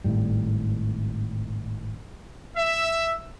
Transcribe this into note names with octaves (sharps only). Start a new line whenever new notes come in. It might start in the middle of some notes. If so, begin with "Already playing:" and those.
G#1 A2 G3
E5